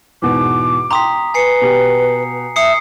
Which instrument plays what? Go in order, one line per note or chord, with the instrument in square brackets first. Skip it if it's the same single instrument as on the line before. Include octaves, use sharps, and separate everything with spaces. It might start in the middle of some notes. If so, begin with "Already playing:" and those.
[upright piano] E2 G#2 B2 [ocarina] D6
[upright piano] G5 C6 [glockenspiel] A#5 D#6 B6
[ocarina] B4 [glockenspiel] G#5 C7 C#7
[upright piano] B2 G4
[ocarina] E5 [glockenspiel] D#6 C7 C#7